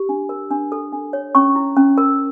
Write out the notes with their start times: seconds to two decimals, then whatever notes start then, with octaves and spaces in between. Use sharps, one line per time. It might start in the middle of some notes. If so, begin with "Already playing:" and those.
Already playing: G4
0.09 D4
0.29 A#4
0.51 D4
0.72 A4
0.93 D4
1.13 C#5
1.35 C#4 C#6
1.56 E4
1.76 C#4
1.98 A#4